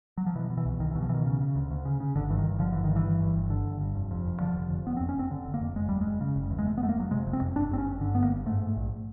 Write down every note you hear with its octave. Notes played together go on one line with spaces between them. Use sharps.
F#3
F3
B2 E3
B2
E3
C2
C2 D#3
E3
B2
F3
B2 D#3 E3
C#3
C#3
D2
D2
C#3
C#3
G1 D3
G2 E3
D#3
G1
D3 F3
G1 E3
D#3
G2
E3
G1
G2
G1
D3
G1
G2
F1
F2
F1
D3 F3
F1
F2
F1 B3
C4
F2
C#4
F1 C4
D3
F1
A#3
F2
F#1 G#3
E2 G3
G#3
F#1
C#3
F#1
E2
G#3
F1 A3
B3
F2 A3
A#3
F1 F#3
C3 G#3
F1
C4
F2
G1 D4
G2 C4
C#4
G1
D3
G1 B3
A#3
G2
G#2 A3
G#2
A#1